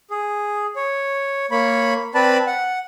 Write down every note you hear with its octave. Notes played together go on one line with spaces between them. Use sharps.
G#4
C#5
A#3 C#5 B5
C4 B4 D5 A5 B5
F#5